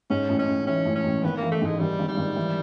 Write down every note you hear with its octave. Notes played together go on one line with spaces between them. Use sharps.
G#2 C#4
A1
C#4
A1
E3 C#4
A1
C#4
A1
G#1 B3
A#3
E3
A3
G#2 G#3
G#1 G3
G#1
G3
G#1
E3